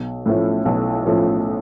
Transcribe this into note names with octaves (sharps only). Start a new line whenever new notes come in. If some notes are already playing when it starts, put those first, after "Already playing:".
Already playing: B1
A2 F3 A3 C#4
B1
A2 F3 A3 C#4